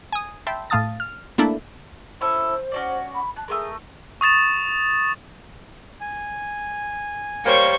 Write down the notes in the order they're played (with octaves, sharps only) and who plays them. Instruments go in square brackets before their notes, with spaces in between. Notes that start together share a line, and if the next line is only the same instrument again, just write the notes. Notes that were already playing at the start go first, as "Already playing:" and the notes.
[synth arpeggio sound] G#5 D#6
E5 G5 A5 B5 C6
A2 A3 F5 A5 D#6 A6
F6
A3 A#3 D4 E4 A4
[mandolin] C#4 E4 A4 [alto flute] C5
[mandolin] C#4 F#4 D5
[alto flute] B5
[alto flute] A5 [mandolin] F#6
[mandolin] A3 C#4 A#4 [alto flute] G#4
[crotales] C#6 D#6 A6 E7
[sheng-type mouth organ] G#5
[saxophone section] G3 A#3 [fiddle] C5 C#6 [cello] C#5